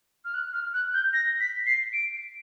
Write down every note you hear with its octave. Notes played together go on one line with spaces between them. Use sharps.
F6
F#6
F6
F#6
G6
A#6
B6
C7
D7